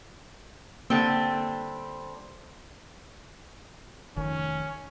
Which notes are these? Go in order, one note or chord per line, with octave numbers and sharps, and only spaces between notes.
D3 G3 A#3 C4
F1 D#3 C#4